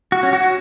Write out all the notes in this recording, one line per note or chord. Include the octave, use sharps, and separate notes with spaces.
F#4
C#4
F#4